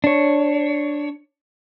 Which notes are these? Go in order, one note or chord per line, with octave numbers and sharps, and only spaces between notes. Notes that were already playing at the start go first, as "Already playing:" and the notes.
D4 C#5